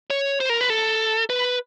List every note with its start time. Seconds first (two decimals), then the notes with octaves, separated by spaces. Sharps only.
0.10 C#5
0.40 C5
0.50 A#4
0.61 B4
0.70 A4
1.30 B4